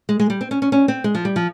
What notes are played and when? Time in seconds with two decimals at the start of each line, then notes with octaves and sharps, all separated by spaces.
0.09 G#3
0.19 G#3
0.30 G3
0.41 C4
0.51 C#4
0.62 C#4
0.72 C#4
0.88 C4
1.04 G#3
1.15 F3
1.25 G3
1.36 F3